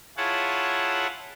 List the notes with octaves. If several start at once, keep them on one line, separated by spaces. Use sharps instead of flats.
E4 F4 G#4 C#5 F#5 A5